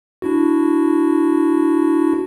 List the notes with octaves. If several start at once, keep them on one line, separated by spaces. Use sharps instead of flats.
D4 E4 F#4